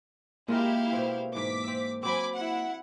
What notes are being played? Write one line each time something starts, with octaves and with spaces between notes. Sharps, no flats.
G#3 A#3 E4 F4 G4 A#4 F5
B2 C4
G#2 E3 D6 B6
C4 E5
F#3 C4 G#5 B5 D6
E4 F#5